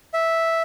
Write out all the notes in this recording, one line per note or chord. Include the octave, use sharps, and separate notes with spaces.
E5